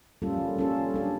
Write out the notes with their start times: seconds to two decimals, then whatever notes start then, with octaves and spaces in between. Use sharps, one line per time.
0.22 G3 A#3 C#4 F4 A4
0.58 G3 C#4 F4 A4
0.94 G3 D4 A4